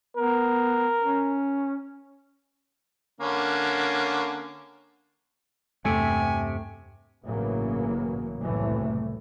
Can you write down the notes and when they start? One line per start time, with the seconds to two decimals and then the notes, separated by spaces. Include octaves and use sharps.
0.17 B3 A#4
1.02 C#4
3.21 D3 A#3 C#4
5.85 E2 G2 C3 A3 G5 G#5
7.25 A1 G2 C#3 E3 F#3 A#3
8.41 F#1 C2 A2 C3 E3 A3